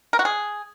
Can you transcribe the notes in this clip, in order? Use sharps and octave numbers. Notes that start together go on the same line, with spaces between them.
A#4
F#4
G#4